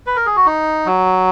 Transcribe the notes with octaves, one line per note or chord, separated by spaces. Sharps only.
B4
A#4
G#4
F#4
D#4
F#3